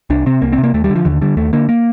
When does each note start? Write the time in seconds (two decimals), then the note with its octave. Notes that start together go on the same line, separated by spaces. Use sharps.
0.10 C2 D4
0.26 C3 C4
0.42 C2 A#3
0.53 C4
0.58 C3
0.64 A#3
0.74 D#2 A3
0.84 G3
0.90 D3
0.96 F3
1.05 D#2 D3
1.21 D3 G3
1.37 D#2 A3
1.53 D3 A#3
1.69 A#3